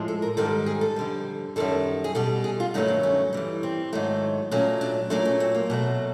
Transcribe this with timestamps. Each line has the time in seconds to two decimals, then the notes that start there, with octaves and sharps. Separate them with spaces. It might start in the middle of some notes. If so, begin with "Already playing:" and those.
Already playing: A2 F3 G#3
0.08 A4
0.22 A#4
0.37 G#2 D#3 G3 A4
0.66 G#4
0.81 A4
0.96 F2 D3 G3
1.56 F#2 D#3 G3 A4
2.04 G#4
2.15 B2 G3 A4
2.44 G#4
2.60 F4
2.74 G2 D#3 F#3 A3 D#4
2.88 D4
3.03 C#4
3.33 G2 E3 G3
3.63 C4
3.93 G#2 D#3 F#3 A3
4.51 A#2 F#3 A3 C#4
4.81 D4
5.10 A#2 F#3 A3 D4
5.25 C#4
5.40 C4
5.55 A#3
5.70 B2 F#3 A3